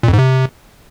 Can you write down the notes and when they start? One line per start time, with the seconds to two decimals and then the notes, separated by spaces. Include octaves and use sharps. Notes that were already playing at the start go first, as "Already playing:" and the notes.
0.03 A#2
0.08 F2
0.13 G#2
0.18 C3